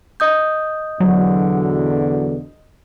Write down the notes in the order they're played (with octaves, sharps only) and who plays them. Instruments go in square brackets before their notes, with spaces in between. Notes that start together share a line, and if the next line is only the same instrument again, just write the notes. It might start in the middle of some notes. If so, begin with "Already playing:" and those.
[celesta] D#5 D#6 G6
[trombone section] E2 B2 D3 [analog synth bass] F#3